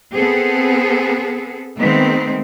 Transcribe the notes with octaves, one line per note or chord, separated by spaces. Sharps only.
B3 C4 G#4 A4
D#3 G#3 A3 B3 C4